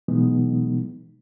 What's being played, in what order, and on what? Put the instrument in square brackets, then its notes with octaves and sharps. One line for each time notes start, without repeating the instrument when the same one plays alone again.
[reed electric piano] B2 E3 F#3 G#3 B3 D#4